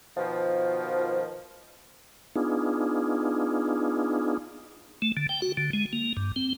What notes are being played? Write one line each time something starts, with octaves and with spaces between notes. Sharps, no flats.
B2 D#3 F3
B3 D4 D#4 F4 G#4
A3
D3
G5
F#4
D3
G#3
A#3
G2
C4